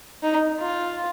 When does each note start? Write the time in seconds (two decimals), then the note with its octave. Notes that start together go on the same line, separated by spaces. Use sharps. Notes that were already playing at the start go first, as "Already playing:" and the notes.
0.23 D#4
0.60 F4